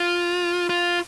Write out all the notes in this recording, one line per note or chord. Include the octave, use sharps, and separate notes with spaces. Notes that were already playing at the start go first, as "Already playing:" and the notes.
Already playing: F4
F4